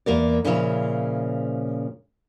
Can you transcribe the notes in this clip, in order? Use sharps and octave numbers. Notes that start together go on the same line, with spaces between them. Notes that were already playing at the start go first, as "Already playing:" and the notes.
E2 A#3 A#4 D5
A#2 C#3 F3 E4 C5 C#5